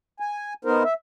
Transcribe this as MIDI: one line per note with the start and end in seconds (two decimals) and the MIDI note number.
0.20 0.53 80
0.65 0.83 59
0.65 0.83 63
0.65 0.83 70
0.65 0.83 72
0.84 0.94 76